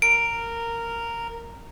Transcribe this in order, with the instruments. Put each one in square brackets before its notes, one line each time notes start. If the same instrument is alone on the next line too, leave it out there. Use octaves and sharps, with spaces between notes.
[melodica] A#4 [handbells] D7